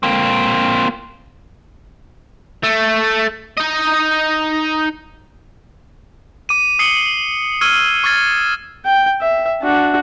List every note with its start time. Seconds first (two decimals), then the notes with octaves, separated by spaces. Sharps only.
0.03 A#3 C4
2.64 A3
3.58 D#4 D#5
6.49 D6 D#7
6.79 D#6 C7 C#7 F#7 G7
7.61 C#6 E6 F6 G#6 D#7 G7
8.04 C#6 D6 F6 G#6 A6 C7
8.86 G5
9.21 E5
9.63 D4 F#4